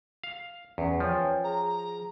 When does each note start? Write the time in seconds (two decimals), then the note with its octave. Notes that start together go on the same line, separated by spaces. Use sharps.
0.24 F5
0.78 E2 C#4 B4
1.00 F3 C#5 G5 G#5
1.44 G#4 A#5